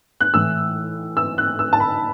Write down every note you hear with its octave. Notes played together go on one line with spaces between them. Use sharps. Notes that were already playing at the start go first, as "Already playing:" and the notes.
F#6
A2 E3 E6
E6
F#6
E6
A5
B5